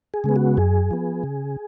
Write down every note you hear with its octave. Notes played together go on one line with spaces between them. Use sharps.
G#4
C#3 G#3 B3
F#4
F#2 G#4
F3 B3
C#3